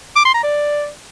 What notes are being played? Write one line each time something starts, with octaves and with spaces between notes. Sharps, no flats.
D6
C6
A#5
D5